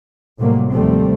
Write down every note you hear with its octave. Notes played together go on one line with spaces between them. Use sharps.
A2 C3 F#3 G3 A#3
D#2 C3 F3 G3 A3 C4